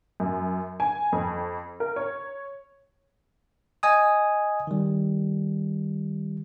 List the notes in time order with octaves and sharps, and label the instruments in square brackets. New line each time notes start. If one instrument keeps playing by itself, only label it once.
[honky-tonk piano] F#2
G#5
F2
A#4
C#5
[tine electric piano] D#5 G#5 D#6
D#3 G3